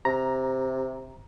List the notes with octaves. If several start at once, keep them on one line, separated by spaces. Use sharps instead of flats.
C3 A#5